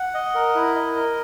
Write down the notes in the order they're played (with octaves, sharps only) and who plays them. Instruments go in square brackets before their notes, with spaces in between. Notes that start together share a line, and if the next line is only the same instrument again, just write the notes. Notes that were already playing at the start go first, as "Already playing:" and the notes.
Already playing: [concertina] F#5
D#5
A#4
E4
D#5
A#4